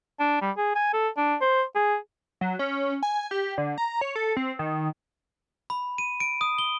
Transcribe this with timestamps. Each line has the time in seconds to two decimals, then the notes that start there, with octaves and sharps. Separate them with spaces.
0.20 D4
0.42 G3
0.58 G#4
0.75 G#5
0.93 A4
1.17 D4
1.41 C5
1.75 G#4
2.41 F#3
2.59 C#4
3.03 G#5
3.31 G4
3.58 D3
3.78 A#5
4.01 C#5
4.16 A4
4.37 C4
4.59 D#3
5.70 B5
5.98 D#7
6.20 D7
6.41 D#6
6.58 G7